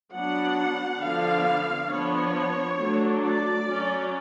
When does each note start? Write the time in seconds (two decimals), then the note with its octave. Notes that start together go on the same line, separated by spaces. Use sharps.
0.13 F#3 B3 D4 F#5
1.01 D3 F3 B3 D4 F5
1.89 F3 B3 D4 C#5
2.78 F#3 A3 D4
3.22 D5
3.66 F#3 C#4